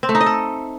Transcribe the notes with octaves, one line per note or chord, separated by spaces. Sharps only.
C4
A3
D#4
D#5
A4